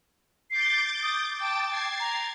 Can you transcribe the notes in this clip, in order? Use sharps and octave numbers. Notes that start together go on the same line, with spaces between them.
D6 G6 A6 C7
D#6
G5 A5 D6 A6
G#6 A6 C7
A#5